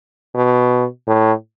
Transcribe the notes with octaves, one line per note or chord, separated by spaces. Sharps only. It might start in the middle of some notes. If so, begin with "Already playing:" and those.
B2
A2